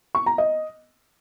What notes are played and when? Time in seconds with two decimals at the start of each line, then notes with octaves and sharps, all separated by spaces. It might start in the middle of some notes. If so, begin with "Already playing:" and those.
0.15 C#6
0.26 A#5
0.38 D#5